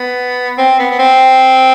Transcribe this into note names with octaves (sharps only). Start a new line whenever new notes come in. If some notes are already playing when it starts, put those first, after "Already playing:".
Already playing: B3
C4
B3
B3
C4